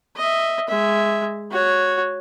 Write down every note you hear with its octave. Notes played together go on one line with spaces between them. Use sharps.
D#5 E5
G#3 E5
F#4 C#5